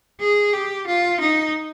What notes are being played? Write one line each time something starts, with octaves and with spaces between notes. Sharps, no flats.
G#4
G4
F4
D#4